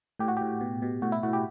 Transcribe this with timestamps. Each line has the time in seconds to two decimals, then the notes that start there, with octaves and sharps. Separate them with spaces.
0.19 A2 G4
0.28 F#4
0.37 A2 G4
0.61 B2
0.82 B2
1.02 A2 F#4
1.12 E4
1.23 A2 F#4
1.33 G4